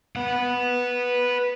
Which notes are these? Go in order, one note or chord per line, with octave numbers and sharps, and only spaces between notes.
B4 F#5